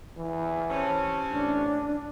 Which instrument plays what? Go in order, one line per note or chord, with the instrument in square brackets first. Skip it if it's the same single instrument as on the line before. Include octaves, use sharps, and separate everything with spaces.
[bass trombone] E3
[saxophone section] C3 C4 C#4 [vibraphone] A5
[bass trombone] A1 [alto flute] D4